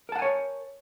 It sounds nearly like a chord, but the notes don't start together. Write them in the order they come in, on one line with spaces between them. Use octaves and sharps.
A#4 A5 F#5 G#5 C#5